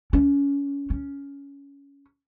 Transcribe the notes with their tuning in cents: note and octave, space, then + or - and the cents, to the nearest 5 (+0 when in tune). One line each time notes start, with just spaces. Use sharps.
C#4 +25
C#4 +15